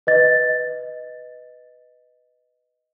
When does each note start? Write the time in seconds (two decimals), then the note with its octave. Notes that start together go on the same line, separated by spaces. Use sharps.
0.07 B4 D#5 A6